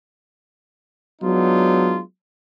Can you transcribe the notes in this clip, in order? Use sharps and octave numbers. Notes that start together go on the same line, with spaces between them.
F#3 G#3 B3 D4 D#4 F4